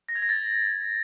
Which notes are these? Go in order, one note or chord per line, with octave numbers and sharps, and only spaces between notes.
A#6
G#6
A#6
A6